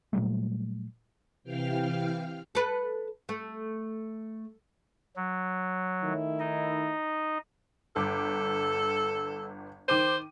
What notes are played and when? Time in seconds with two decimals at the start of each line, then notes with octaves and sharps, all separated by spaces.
0.13 A#2 F#3 G3 A3
1.44 C3 E3 F5 G5 F6
2.55 A4 B4
3.29 A3
5.16 F#3
6.03 D#3 A3 E4
6.40 D#4 D#5
7.96 G1 A4 D6
9.88 D#3 C5 D6 D#7